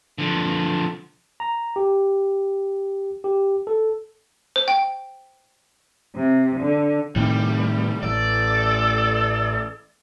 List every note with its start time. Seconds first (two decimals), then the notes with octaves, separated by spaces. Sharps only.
0.18 D3 F3
1.40 A#5
1.76 G4
3.24 G4
3.67 A4
4.56 C5
4.68 G5
6.16 C3
6.61 D3
7.16 A2 C3 D#3 G3
8.03 A1 A4 D5